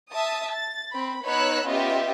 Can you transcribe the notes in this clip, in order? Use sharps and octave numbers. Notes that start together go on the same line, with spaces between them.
E5 A5 D#6
A6
C4 B5
B3 D#4 C#5 B5 E6 F#6
B3 C#4 F4 G4 D#5 E5